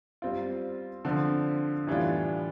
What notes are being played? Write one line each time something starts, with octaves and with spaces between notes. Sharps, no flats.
G3 C4 F4
D3 F3 C4
A2 E3 G3 D4 F4